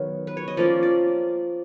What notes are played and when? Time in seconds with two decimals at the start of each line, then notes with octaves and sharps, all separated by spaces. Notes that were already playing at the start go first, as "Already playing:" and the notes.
Already playing: D#3 F#3 B3
0.27 B4
0.37 C#5
0.48 D#5
0.57 F3 A#3 C#4 D5
0.83 D5